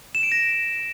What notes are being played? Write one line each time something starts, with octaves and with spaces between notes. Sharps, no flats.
E7
D7
A#6